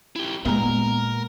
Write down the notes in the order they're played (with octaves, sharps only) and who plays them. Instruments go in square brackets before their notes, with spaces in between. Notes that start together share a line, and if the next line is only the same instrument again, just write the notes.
[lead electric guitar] E4 G4
[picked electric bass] A#2 [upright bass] G#3 B3 [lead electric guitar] A#4 A#5